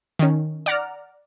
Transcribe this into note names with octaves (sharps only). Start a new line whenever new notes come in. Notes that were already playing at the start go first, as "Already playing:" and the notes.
D#3 C#4
D5 F#5 A#5 F6